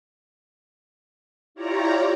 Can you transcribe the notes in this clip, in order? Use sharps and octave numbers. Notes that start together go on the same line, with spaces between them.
E4 F4 G4 C#5 D5 A#5